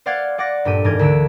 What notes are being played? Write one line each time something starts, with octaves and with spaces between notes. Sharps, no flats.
C5 D5 F5 F#5 G#6 A6
D5 F#5 D6 A6 A#6
G2 A#2 G4 A4 D#7
E1 G#2 A#4 D5 G6 G#6
D2 D3 E6 D7